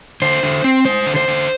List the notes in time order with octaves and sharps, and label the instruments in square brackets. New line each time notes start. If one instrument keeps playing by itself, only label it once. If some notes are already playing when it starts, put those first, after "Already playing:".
[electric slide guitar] D3 C5
D3
C4
G#3 C5
D3
C5
D3